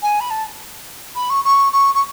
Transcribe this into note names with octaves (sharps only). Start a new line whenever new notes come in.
G#5
B5
A5
B5
C#6
C#6
C#6
C#6